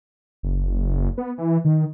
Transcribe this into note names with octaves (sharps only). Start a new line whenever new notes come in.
F#1
B3
E3
D#3